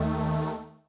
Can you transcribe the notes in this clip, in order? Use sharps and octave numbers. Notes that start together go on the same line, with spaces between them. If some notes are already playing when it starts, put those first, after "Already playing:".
Already playing: D#2 D#3 A3